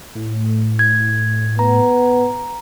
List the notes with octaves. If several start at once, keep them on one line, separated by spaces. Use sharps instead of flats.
A2
G#6
B3 A#5